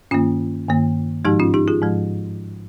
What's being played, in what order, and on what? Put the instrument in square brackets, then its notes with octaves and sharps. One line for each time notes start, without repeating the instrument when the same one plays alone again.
[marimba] G2 D#3 A#3 C#4 F4
G2 D#3 A#3
G#2 F3 G#3 D#4 G4
C#4 F4
D#4 G4
F4 G#4
G#2 F3 G#3